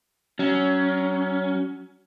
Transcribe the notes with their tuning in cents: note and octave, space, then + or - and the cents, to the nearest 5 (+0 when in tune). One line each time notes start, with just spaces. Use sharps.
F#3 +25 C#4 +15